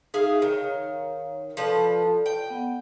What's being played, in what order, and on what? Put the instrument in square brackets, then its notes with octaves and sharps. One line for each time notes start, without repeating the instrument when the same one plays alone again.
[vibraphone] D#4 [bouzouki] G#4 E5 F5
[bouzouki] D#3 [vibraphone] C#5 F5
[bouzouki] F3 B4 [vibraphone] A4 D5 A5
[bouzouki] G5
[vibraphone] B3 F#5